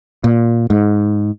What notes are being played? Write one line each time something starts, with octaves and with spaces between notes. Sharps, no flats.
A#2
G#2